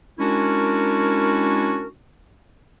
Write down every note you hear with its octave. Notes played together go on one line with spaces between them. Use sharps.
G#3 C#4 D4 E4 F#4 A#4